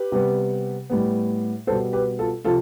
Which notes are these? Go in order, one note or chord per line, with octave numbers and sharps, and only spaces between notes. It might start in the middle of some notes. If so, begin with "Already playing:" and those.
Already playing: G4 B4
C3 G3 B3
A2 G3 B3
B2 G3 B3 A4 C5
G4 B4
F4 A4
C3 F3 F4 A4